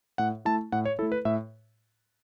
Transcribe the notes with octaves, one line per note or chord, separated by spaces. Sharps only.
A2 F#5
A3 E4 A5
A2 F#5
C#5
A3 E4 A4
B4
A2 E5